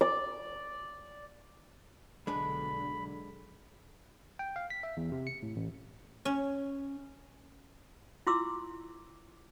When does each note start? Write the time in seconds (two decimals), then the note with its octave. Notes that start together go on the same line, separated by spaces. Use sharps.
0.01 D5
2.27 B1 D3 G#3 D4 B4 B5
4.39 G5
4.56 F5
4.70 B6
4.83 E5
4.97 E2
5.12 C3
5.27 C#7
5.43 A2
5.56 A1
6.25 C#4
8.27 E4 F4 C6 D6 E6